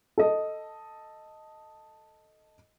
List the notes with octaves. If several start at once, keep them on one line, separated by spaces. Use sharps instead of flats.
A4 D#5